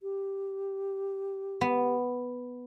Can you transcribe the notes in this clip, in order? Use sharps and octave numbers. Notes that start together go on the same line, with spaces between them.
G4
B3